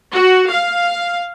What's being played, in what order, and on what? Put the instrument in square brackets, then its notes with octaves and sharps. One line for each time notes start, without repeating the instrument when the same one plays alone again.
[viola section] F#4
F5